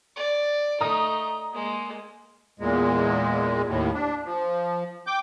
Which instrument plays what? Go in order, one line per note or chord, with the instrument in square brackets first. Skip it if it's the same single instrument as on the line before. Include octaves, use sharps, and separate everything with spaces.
[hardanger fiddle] D5
[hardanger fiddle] A3 D#4 [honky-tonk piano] A#5 D#6
[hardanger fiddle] G#3 A#3
[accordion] E2 A#2 G#3
D#2 A2
D4
F3
G5 D6 G6